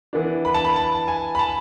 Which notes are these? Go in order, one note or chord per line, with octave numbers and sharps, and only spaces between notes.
E3 B3 D4
B5
A5
B5
A5
G#5
B5
A5